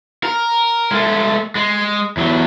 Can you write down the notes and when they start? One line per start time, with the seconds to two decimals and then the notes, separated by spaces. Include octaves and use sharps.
0.23 A#4
0.92 G#3 A3
1.55 G#3
2.17 E2 F#3